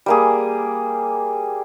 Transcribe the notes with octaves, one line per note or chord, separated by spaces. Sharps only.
G3 A#3 G#4